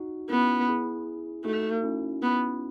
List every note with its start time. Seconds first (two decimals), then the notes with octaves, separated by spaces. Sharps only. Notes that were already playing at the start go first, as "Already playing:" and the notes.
Already playing: D#4 F#4
0.30 B3 C#4 E4
0.69 E4 G#4
1.45 A3 D#4 F#4
1.83 C#4 E4
2.22 B3